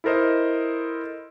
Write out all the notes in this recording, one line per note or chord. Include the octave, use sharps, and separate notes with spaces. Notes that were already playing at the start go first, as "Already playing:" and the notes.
E4 A4 A#4 C5 D#5